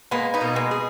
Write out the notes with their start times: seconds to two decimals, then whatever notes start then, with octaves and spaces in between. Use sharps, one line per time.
0.11 G#3 A#3 B3
0.34 B3 D#4
0.41 B2
0.56 G#3 B3
0.71 G#4